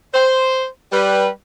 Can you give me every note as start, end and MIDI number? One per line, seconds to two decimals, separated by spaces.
0.14 0.66 72
0.92 1.27 55
0.92 1.27 71